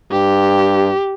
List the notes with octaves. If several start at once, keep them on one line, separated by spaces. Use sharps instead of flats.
G2 G4